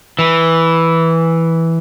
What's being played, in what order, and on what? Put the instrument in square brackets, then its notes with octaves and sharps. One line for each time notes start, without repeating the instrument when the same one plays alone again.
[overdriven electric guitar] E3